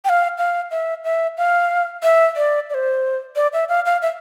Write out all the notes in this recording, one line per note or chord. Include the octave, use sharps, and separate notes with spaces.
G5
F5
F5
E5
E5
F5
E5
D5
D5
C5
D5
E5
F5
F5
E5